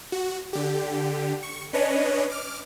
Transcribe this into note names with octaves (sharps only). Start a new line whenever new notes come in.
F#4
D3 G4
C#6
C#4 D4 B4 C#5 D#5
D6 F6